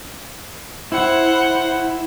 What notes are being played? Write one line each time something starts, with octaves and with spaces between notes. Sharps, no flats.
E4 C5 F#5